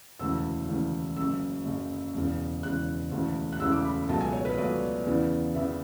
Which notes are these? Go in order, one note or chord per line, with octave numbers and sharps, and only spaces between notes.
E1 D2 C#3 E3 E6
E1 D2 C#3 E3
F#1 F#2 C#3 E6
F#1 F#2 C#3
E1 E2 C#3
E1 E2 C#3 F#6
E1 D2 C#3 E3 A3
F#6
E1 D2 C#3 E3 A3 E6
D6
B5
C#2 B2 F#3 A3 A5
G#5
C#5
B4
C#2 B2 F#3 A3 D5
E2 C#3 E3 B3
E2 C#3 E3 B3 E5